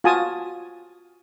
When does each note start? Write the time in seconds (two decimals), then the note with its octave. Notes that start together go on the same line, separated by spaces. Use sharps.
0.04 F4 F#4 G#5 A5 D#6